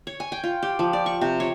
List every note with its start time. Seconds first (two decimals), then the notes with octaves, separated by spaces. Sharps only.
0.07 C#5
0.20 G#5
0.32 G5
0.44 F4
0.63 G4
0.79 F3
0.93 D5
1.06 C#6
1.21 C3
1.40 C#5